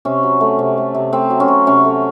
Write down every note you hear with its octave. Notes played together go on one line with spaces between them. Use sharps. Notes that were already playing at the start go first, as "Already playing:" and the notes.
C3 C#4
F#3
A3
C3
A3
C3
A3 C4
F#3
C#4
F#3
C3 C#4
A3